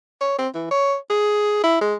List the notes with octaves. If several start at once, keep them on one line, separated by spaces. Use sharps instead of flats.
C#5
C4
E3
C#5
G#4
E4
G#3